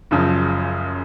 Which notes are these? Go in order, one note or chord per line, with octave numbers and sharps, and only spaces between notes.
F#1 F#2 C#3 F3